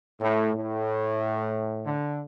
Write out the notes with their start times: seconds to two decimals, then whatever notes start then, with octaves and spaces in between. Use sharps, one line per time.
0.21 A2
0.54 A2
1.86 D3